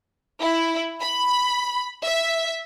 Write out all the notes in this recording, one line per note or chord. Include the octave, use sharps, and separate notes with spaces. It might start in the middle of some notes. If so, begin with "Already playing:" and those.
E4
B5
E5